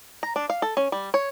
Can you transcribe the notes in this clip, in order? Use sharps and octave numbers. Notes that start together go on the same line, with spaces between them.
A#5
D4
F5
A4
C#4
G3
C#5